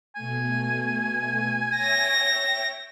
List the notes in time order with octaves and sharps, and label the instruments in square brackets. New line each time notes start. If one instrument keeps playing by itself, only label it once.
[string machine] B2 A3 [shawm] G#5
[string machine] C#5 E5 G5 [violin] A#6